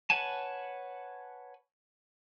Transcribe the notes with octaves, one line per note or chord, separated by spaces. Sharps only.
B4 C#5 F#5 G#5 A5